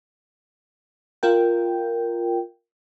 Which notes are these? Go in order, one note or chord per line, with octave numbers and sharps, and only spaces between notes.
F4 A#4 G5